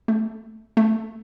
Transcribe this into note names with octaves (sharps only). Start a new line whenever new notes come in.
A3
A3